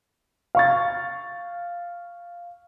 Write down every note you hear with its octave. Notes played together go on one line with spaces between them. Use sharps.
F5 C#6 A6